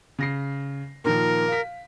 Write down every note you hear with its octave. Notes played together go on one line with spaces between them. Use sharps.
C#3 A#6 C7
A#2 D#3 F3 A#4
F5 B6